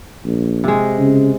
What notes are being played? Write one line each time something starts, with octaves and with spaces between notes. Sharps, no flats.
A#1
C3 G#3
C#3